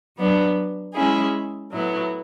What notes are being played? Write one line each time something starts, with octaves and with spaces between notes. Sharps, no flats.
F#3 B3 D4
G#3 C#4 E4 G#4
A2 F#3 B3 E4